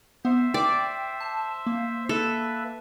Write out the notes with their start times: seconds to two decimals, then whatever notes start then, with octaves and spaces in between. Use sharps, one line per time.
0.25 B3 C5 E5
0.54 D5 G5
1.20 A5
1.66 A#3
2.09 A4 B4 E5